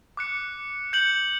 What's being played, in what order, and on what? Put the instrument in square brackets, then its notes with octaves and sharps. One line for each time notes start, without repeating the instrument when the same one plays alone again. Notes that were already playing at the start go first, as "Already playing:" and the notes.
[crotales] D6 F#6 C#7
G6 C#7 F#7